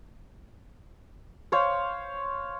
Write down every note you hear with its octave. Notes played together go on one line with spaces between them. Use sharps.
C5 C#5 F5